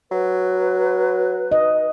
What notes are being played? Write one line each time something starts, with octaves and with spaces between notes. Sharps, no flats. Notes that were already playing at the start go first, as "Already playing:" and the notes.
F#3 B4
D#5